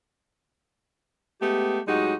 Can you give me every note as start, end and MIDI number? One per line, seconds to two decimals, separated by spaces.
1.41 1.80 56
1.41 1.80 57
1.41 1.80 59
1.41 1.80 67
1.87 2.14 45
1.87 2.14 54
1.87 2.14 56
1.87 2.14 63
1.87 2.14 66
1.87 2.14 67